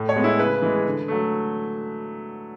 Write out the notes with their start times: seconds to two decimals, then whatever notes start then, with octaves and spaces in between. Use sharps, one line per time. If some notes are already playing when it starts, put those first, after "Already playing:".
Already playing: A2
0.09 C#5
0.16 G#3 B3
0.24 E4
0.39 C#3 B4
0.62 E3 G#3
0.86 D3
1.08 F#3 A3